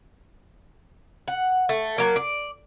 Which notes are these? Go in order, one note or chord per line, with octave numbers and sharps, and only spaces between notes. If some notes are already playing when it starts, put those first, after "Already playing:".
F#5
A3
F#3 A#3
D5